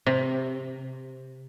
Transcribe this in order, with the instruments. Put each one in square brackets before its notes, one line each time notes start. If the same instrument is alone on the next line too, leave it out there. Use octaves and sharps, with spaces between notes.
[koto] C3